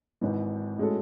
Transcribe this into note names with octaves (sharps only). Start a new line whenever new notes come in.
G#1 G#2 E3
A2 G#3 C#4 F#4 A4